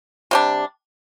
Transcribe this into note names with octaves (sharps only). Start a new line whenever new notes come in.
C3 G3 D4